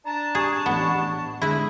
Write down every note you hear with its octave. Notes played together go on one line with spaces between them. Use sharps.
D4 A5 A#5
G4 G#4 C#6
A1 B3 C#7
D3 G#3 E4 G#4 B4